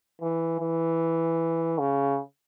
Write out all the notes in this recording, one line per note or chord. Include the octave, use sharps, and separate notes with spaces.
E3
E3
C#3